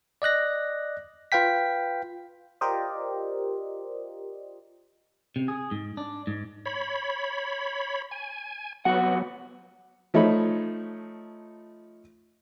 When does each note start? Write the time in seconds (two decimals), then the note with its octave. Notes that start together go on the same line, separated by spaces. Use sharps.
0.22 D5 D#5 F#6 A#6
1.32 F4 B4 F5 G5 B6
2.61 F4 G4 A#4 C5 D5 D#5
5.36 C3
5.48 G#4
5.71 G#2
5.97 D4
6.27 G#2
6.66 C#5 B5
8.11 G#5
8.85 C2 F#3 B3 F#4 F#5
10.14 F3 A3 D#4 C#5 B5